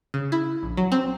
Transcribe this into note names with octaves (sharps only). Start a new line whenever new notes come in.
C#3
E4
A#1
F#3
C4